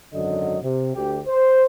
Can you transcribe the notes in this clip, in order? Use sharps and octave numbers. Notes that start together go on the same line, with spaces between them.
G#1 F#2 D3 F#3 D#5
C3
D2 G4
C5